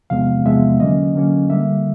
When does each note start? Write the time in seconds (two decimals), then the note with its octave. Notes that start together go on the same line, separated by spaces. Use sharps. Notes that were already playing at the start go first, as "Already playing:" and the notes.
0.10 E2 C3 F3 G#3 B3 F5
0.45 E2 C3 F3 G#3 B3 E5
0.80 D3 F#3 A#3 C#4 D#5
1.15 D3 F#3 A#3 C#4
1.50 D3 G3 A#3 E5